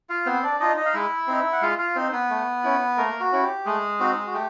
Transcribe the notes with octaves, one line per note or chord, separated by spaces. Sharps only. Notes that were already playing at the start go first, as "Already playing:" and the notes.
F4 F5
B3 C4 C5
D4 D5
D4 D#4 F4 D#5
D#4 D#5
F5
G#3 E4 E5
C4 D#4
F#5
G#3 F4 F5
F4 F5
C4 D#4 C5
B3 B4
A3
C#4 E4
A3 A#3 A#4
F#4
C#4 E4
G4
G#3 A3 G#4
C4 D#4 F#4
F#4
A3 G4